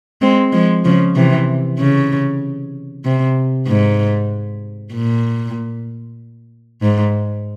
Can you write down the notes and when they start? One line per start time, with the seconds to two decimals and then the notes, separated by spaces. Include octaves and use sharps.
0.21 G#3 C4
0.53 F3 G#3
0.85 C#3 F3
1.16 C3 E3
1.79 C#3
3.05 C3
3.68 G#2
4.93 A#2
6.82 G#2